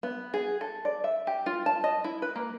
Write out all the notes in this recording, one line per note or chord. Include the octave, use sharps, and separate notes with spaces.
B3
G#4
A4
D5
E5
G4
F4
A5
D#5
E4
B4
A#3